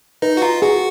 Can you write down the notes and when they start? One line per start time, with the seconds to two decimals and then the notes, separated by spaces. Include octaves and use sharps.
0.22 D#4 B4
0.37 F#4
0.42 F4 A#5
0.62 F#4 G#4